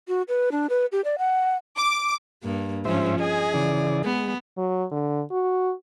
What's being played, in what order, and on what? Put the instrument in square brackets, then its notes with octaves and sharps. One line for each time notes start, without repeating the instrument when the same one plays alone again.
[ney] F#4
B4
D4
B4
G4
D5
F#5
[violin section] D6
[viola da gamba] G2 A#3
[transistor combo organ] G#2 C5 E5 [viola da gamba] F3 C#4
[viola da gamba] G#4 [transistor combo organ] D#5 G#5
[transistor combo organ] C#3 E3 D5
[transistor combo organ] G#3 [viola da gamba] B3
[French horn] F#3
D3
F#4